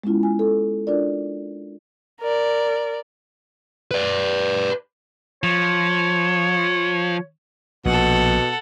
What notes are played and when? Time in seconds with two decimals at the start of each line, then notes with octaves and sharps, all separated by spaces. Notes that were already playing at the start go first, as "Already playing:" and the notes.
0.04 G#3 B3 C#4 E4 F4
0.23 G#5
0.39 A4
0.87 D4 F4 A#4 D5
2.21 A#4 D5
3.91 B4 D5
5.43 F3 C#5
7.85 A#1 B2 A4 F#5